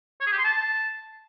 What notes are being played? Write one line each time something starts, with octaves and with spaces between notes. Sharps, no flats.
C#5
G#4
G4
C6
A5